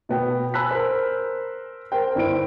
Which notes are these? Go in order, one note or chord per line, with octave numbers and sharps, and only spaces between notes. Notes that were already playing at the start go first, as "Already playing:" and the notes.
B2 B3 G5
G#5 A5 B5 E6 F#6 B6
A#4 C5
A#4 C5 G5
G1 E4 C5 D7